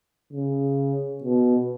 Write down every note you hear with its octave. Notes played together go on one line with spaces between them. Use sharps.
C#3
B2